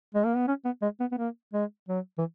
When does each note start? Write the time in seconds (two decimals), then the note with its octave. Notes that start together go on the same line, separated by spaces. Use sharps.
0.14 G#3
0.25 A#3
0.36 B3
0.48 C#4
0.65 B3
0.82 G#3
1.00 B3
1.12 B3
1.18 A#3
1.53 G#3
1.89 F#3
2.18 E3